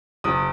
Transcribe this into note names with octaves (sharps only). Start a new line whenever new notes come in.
F#1 D#6